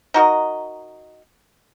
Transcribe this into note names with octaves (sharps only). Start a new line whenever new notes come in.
D#4 F#4 A#4 D#5